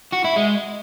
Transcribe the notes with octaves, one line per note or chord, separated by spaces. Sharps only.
F#4
E4
G#3